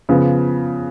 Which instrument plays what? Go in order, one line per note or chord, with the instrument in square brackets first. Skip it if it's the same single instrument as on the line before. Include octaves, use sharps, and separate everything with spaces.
[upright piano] C#3 F3 B3